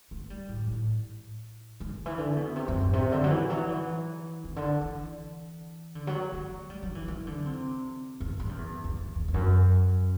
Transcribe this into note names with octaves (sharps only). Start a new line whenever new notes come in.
A3
G3
A2
A2
A3
D3
E3
D3
B2
C3
F#2
A2
C3
D3
F#3
E3
F#3
E3
C3
D3
E3
D3
F#3
A3
G3
F#3
E3
E3
D3
C3
E2
G2
F#2
E2
E2
E2
E2
E2
F#2